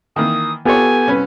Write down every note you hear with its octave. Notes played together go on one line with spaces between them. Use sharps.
D#3 E3 A#3 D#6
B3 F4 G4 A4 C#5 G#5
C2 C#4 B4